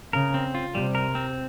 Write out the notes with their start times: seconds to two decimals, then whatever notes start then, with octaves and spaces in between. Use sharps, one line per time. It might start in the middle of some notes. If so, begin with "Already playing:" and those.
0.13 C#3 A#4
0.34 C4
0.55 F4
0.74 C3 G3
0.95 A#4
1.15 C4